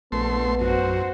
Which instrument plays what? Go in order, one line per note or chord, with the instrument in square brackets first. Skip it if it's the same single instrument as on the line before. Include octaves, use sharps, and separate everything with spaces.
[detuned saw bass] A#1 [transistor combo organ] A3 C6 [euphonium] B3
[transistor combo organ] F#2 [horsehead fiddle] F#4 C5